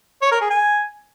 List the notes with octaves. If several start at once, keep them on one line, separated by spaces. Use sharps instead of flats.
C#5
A#4
G#4
G#5